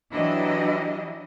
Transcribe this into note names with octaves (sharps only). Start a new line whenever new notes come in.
E3 F#3 D4 E4 G4 D#5